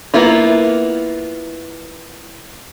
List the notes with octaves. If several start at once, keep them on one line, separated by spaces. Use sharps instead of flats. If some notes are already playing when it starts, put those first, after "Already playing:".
A#3 B3 E4 F4